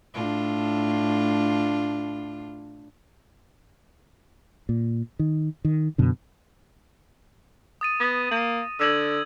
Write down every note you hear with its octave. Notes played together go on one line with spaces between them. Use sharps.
A2 D4 F4
A#2
D#3
D#3
F#2 B2 D3
D#6 A6 D#7
B3 A#6
A#3
D3 E6 G#6 F#7